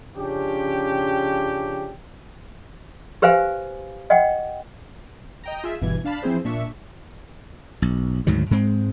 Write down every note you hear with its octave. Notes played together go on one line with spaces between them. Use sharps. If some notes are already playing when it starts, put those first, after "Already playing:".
C#3 F3 C#4 D4 G4
G4 B4 C5 F5 G#5
D#5 F#5 G5
D#5 G5 A#5
F4 G#4 E5
G1 G2 B2 E3 G#6
D4 F5 A5 B5
E3 F3 C4 E4 G#4 C5
A#2 D4 E5 C#6
B1
D2 G#2 D#3 F#3
G#2 G#3 C4